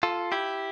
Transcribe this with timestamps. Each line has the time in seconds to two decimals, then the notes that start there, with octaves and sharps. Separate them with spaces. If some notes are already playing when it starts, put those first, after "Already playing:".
0.03 F4 A4
0.32 E4 G4